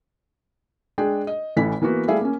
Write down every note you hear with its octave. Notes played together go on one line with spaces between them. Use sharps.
G#3 D4 G#4 G5
D#5
A1 E3 A3 C#4 B6
E3 A#3 B3 F#4
G3 A3 E4 G#4 E5 F5
A#3 C#4